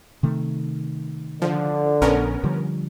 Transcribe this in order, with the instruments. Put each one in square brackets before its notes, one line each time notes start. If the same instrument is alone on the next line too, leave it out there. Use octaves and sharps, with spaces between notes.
[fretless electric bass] C3 D#3 A3
[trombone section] D3 [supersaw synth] F3
[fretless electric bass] A#1 [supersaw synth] B3 C#4 A#4
[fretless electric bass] D3 F3 G3